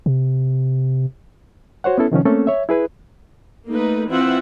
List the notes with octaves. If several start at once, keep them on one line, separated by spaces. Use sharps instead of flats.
C3
F#4 C5 C#5 F#5
B3 C#4 E4 A4
C3 D#3 F3 C#4
A3 A#3 C4 C#4 A4
C#5 E5
E4 G#4 B4
A3 A#3 D#4 B4
E3 C4 E4 F4 E5 F#5